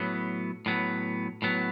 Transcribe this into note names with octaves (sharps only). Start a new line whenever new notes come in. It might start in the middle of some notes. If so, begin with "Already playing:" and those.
Already playing: A2 F#3 B3
A2 F#3 B3
A2 F#3 B3